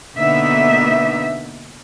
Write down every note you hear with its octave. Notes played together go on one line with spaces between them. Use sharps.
B2 D3 A#3 B3 D#4 E5